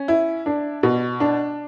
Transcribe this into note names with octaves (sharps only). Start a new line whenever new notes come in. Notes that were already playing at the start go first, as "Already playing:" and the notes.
Already playing: C#4
E4
D4
B2
D4